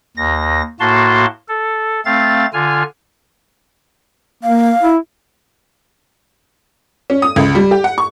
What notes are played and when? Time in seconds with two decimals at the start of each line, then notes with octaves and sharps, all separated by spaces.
0.17 D#2 A#6
0.80 A2 A#3 F#4 A5 C6
1.48 A4
2.05 A3 C4 F5 A6
2.53 D3 F4 G#5 F6
4.43 A#3 F5
4.82 E4
7.10 C#4
7.22 D#6
7.36 C#2
7.55 G3
7.71 G4
7.84 F#5
7.98 C#6